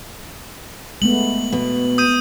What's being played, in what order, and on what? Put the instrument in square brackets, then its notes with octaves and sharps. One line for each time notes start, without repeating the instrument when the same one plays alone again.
[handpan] G#3 A3 B3 [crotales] F#7
[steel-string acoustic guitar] B2
[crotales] D#6 G6 D#7